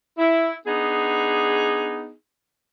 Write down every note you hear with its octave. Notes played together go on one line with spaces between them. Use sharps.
E4
B3 D4 D#4 G#4